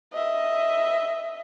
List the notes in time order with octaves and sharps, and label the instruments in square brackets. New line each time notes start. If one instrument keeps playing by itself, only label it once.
[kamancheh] D#5 E5